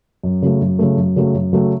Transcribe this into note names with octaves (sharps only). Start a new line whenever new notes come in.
F#2
C#3 F#3 A3
F#2
C#3 F#3 A3
F#2
C#3 F#3 A3
F#2
C#3 F#3 A3